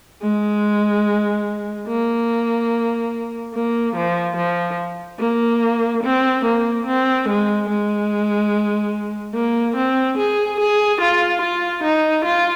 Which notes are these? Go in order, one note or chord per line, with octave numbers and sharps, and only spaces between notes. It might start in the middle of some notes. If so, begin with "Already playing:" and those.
G#3
A#3
A#3
F3
F3
A#3
C4
A#3
C4
G#3
G#3
A#3
C4
G#4
G#4
F4
F4
D#4
F4